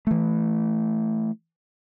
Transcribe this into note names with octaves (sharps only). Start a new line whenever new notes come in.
E3 A3